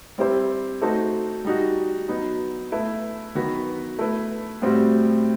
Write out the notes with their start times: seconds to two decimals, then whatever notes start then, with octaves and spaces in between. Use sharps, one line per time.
0.18 G3 C4 E4 G4 C5
0.81 A3 D#4 F#4 A4 C5
1.45 G3 D#4 F#4
2.08 F#3 B3 D#4
2.72 A3 E4 B4
3.35 D#3 F#3 B3 F#4 B4
3.99 A3 E4 B4
4.62 A2 G3 C4 F#4